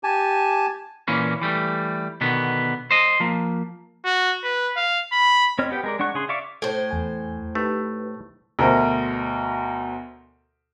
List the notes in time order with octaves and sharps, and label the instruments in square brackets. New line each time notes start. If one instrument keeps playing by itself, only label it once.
[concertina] G4 G#5 A5
[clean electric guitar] A#2 E3 A#3 C#4
E3 G3 A3
B2 D3 D#3 B3
C5 D#5
F3 A#3
[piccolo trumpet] F#4
B4
F5
B5
[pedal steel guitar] C4 C#5 D#5 F6
B3 G4 G5
G#3 A#4 D5
G#3 D4 F#5 C#6 F#6
C#3 G#4 C6
D5 E5 F5 C#6 D6
[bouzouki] A2 C5 [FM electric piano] A4 C#5 A5
[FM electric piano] E2 G#5
[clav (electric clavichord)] A3 [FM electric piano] D#4 G4 B4
[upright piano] D2 B2 A#4 C5 E5